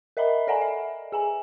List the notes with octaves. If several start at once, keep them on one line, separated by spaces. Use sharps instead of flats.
A#4 D#5 E5 A#5 B5
A4 D5 F#5 G#5 A#5
E5
G#4 G#5 A#5